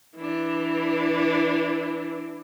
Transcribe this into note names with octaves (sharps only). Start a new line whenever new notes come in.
E3 D4